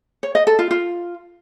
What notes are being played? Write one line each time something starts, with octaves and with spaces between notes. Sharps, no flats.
C#5
D#5
A4
F4
F4